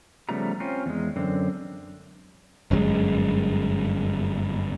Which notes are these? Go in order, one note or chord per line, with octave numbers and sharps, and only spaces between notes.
C#3 F3 G3 A3 B3 A#5
C4 C#4 F4
E2 G#3
F#2 D3 C4
G1 F#2 A2 G#3